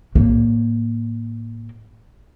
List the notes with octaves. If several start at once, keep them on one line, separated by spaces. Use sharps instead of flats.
A2 A#3